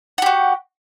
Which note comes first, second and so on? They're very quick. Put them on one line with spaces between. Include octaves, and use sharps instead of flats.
F#5 G4 F#4